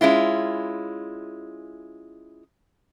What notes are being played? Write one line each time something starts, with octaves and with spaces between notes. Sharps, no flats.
G#3 C#4 E4 F4